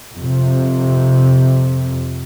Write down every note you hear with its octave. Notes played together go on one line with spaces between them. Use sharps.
F2 C3